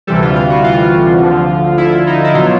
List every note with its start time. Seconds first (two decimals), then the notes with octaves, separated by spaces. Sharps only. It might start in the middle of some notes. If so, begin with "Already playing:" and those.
0.07 D2 C3 E3 G3 A4
0.22 F4
0.36 F4
0.50 F#4
0.64 F4
1.21 D2 D3 F3
1.78 E4
2.07 D#4
2.25 E4
2.34 B2 F#3 F4